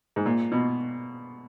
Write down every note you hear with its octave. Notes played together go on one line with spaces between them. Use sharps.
G#2
A#2
B2